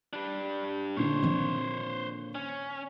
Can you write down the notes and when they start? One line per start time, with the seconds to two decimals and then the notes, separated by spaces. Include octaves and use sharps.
0.13 G3 D4
0.97 A#2 D3 C5 C#5
1.23 D#3 F3 C4
2.35 C#4